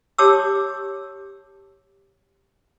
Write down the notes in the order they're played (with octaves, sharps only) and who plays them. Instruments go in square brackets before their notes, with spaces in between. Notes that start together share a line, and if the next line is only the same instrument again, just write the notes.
[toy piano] G4 C#5 A5 D6 E6